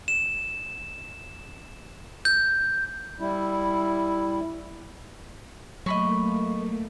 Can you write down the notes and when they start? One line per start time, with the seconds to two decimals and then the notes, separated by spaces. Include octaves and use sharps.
0.08 E7
2.25 G6
3.20 G3 E4
5.86 F#3 A3 A#3 D#5 B5 C#6